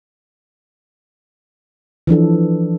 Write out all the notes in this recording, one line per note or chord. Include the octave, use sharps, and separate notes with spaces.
E3 F3 D4 A4